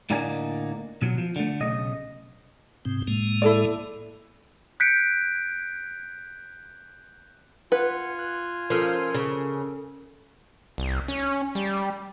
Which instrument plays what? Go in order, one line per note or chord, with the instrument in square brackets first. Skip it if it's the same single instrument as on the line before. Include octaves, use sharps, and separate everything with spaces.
[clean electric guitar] A2 D3 A#3 D#4 D5 G#5
B2 F#3
F3
D3 A3
B1 C#3 D#5
[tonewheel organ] G#2 C3 C4
A2 G#3 A#3
[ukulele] E4 A4 D5
[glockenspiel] F#6 G6 B6 C#7 D7
[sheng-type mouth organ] F4 G#5 [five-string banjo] B4 [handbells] F#5
[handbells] F#6
[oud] F3 [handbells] C#4 A4 A#4
[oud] C#3
[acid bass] C2
C#4
G3